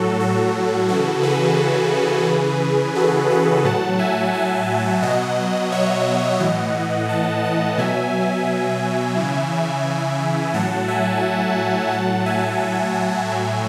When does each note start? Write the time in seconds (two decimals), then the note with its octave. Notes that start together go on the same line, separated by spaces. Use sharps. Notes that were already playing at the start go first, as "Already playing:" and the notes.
Already playing: A2 F#3 F#4 A4
0.20 F#4 A4
0.89 C#3 E3 F#4 A4
1.23 G#4 B4
2.28 C#3 E3
2.95 F#4 A4
3.30 G#4 B4
3.64 A2 F#3 F#5 A5
3.99 E5 G#5
4.34 E5 G#5
5.02 B2 F#3 D#5 F#5
5.72 C#5 E5
6.40 A2 E3 D#5 F#5
7.09 F#5 A5
7.43 D#5 F#5
7.78 B2 F#3 E5 G#5
9.17 C#3 E3
10.53 A2 F#3 F#5 A5
10.88 E5 G#5
11.91 A2 F#3 F#5 A5
12.26 E5 G#5
13.30 A2 F#3